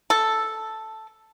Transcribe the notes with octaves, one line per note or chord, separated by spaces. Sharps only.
A4